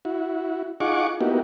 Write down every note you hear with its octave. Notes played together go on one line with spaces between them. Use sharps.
E4 F#4
D#4 F4 G#4 F#5 C#6 D6
A#3 B3 D#4 E4 F#4 G4